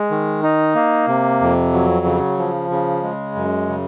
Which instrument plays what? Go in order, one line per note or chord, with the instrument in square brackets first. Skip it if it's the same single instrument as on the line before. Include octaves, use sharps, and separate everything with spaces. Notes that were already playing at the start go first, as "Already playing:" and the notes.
Already playing: [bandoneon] G#3
D#3
D#4
A#3
C3
F2
F#3
C#3
F3
C#3
G#3
F#2
C#3